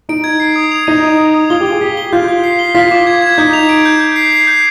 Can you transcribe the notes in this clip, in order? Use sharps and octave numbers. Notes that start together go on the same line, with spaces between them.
D#4 D7
G#6
C7
D#6
F7
D#4 D#7
D#6
D#6
D#6
F4 G7
G4
G7
G#4
G4 B6
G7
F4 G6
G6
C7
G7
F4 B6
D6
G#6
G#6
D#4 G6
F7
D7
G6
G6
C7
C7
G6